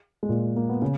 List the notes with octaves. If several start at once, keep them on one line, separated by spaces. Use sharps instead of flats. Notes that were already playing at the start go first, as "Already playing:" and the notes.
G#3
A#2 A#3
A#3
B3
C#3 C#4